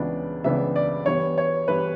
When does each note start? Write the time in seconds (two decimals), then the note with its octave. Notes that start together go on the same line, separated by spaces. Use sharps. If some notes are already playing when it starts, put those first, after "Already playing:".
Already playing: C#2 C#3 E3 B3 D4
0.44 C#2 C#3 E3 B3 D4 E5
0.76 D5
1.06 G2 E3 B3 C#5
1.38 C#5
1.68 G2 E3 B3 B4